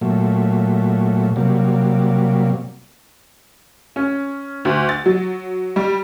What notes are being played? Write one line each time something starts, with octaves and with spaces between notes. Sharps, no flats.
A#2 F#3 A3
C3 F#3 G3 A#3
C#4
D2
A6
F#3
G3